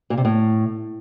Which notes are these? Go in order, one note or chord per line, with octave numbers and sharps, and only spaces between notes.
A#2
C3
A2